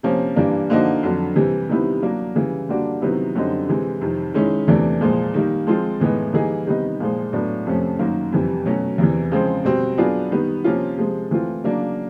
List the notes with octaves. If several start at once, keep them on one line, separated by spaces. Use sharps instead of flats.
C3 F3 A#3 C#4
G2 E3 G3 A#3 D4
D3 F3 A#3 D#4 F#4
F2 D3 F#3
C3 E3 G3
C3 D#3 G3 B3 E4
F#3 A#3 D4
C#3 E3 G3
D3 G3 A#3 D4 F#4
C3 D#3 F#3 B3 E4
F#2 D3 G3 C4 D#4
C3 E3 G#3
F2 C3 D#3
D#3 G#3 C#4 E4
E2 C3 E3 A3 D4
A#2 F3 G#3
D#3 G3 A#3
F3 G#3 C4 F4
A2 E3 G#3 B3 D#4
E3 G3 A#3 D#4 G#4
C3 D#3 G3 B3 D#4
A#2 F3 G#3
A2 F#3 B3 D4
F2 C3 F3 A3 C#4
F#2 D#3 F#3 A#3
F2 C3 E3 G3
B2 F#3 A3 C#4
E2 C3 E3
C#3 F3 G#3 C4
B2 G3 C4
F#3 B3 D4 F4 G#4
D#3 G3 B3
C3 F3 A#3 C#4 F4
C3 F3 G#3
E3 A3 C4 F4
C#3 F#3 A#3 D4